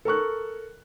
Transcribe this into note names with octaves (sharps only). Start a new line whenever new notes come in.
A4 A#4 C#6 F#6